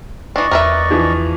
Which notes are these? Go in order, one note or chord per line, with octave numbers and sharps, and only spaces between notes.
E3 D4 D5 D#5 C#6
E2 A#4 B4 E5
E3 F3